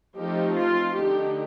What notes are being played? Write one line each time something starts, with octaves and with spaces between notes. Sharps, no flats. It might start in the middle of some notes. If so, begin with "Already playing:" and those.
F3 A3 C4 D#4 G4
F4
D3 A3 D#4 G4